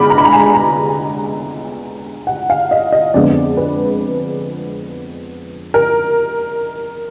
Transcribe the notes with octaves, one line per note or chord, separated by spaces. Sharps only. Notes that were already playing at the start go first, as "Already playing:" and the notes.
Already playing: D3 G#3 B3 B5 D6 F6
A#5
B5
A#5
G#5
A#5
F#5
F5
D#5
D#5
F2 D3 G#3 B3 D5
B4
A#4